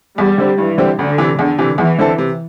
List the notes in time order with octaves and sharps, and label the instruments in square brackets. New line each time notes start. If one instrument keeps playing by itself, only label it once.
[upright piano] E2 [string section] G3
[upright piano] D3 C4
[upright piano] G2 [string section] E3
[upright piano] D3 G3 C4 G4
[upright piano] D2 [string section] D3
[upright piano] C3 E3
[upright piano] E2 [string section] D3
[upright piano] C3 E3
[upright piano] E2 [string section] E3
[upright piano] D3 C4 A4
C3